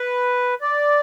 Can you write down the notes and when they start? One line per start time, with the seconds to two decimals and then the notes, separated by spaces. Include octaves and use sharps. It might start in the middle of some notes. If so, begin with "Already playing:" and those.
Already playing: B4
0.61 D5